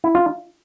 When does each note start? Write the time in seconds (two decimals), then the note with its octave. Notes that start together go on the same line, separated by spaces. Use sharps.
0.04 E4
0.15 F4